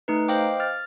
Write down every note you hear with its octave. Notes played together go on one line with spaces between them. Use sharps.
A3 D#4 B4
C5 D#5 F5 G5 D6
F6 A6